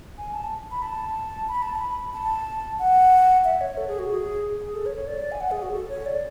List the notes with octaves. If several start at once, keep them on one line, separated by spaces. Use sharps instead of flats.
G#5
A5
B5
A5
B5
A5
B5
A5
F#5
E5
C#5
A4
G#4
F#4
G#4
G#4
A4
C#5
C#5
D5
G#5
F#5
G#4
F#4
A4
C#5
D5